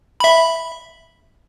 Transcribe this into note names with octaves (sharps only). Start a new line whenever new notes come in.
E5 B5